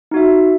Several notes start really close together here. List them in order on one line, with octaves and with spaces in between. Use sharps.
D#4 F#4 E5